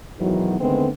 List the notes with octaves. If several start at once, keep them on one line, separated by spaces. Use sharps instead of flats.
B1 G#2 D#3 E3 F#3
D3 D#3 G#3 A3 B3 C4